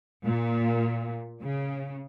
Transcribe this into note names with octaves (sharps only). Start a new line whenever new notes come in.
A#2
C#3